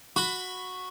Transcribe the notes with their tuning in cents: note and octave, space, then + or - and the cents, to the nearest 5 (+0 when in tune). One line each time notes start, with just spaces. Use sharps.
F#4 -10 B5 +15